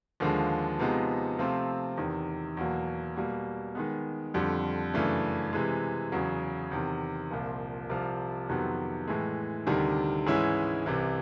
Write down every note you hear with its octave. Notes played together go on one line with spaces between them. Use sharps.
D#2 D3 F3 G#3
C3 F3 G#3 B3 D#4
C3 F3 A3 C4 F4
E2 C3 D#3
E2 B2 F#3 A#3
B2 G3 A#3
D#3 G#3 B3
F2 D3 G3
F#2 C#3 E3 A3 D4
C3 E3 G#3
E2 C#3 F#3
E2 C3 D#3
C2 A#2 F3
C2 C3 F3
F2 C3 D#3 F#3 B3
A2 E3 G#3
D2 C3 D#3 G3
G#2 E3 G#3 C#4 E4
C2 C3 E3